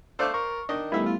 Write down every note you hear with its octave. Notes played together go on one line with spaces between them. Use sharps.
A3 C5 D5 F5
A#4 C#6
D#3 D4 D#5
E3 G3 A3 B3 E4 E5
F4